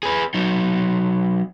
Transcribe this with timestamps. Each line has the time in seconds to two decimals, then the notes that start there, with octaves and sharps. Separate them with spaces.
0.03 G#4 B4
0.34 F#3 D#4